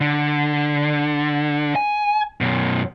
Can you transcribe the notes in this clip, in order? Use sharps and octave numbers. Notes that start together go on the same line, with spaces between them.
D3
G#5
F#2 B2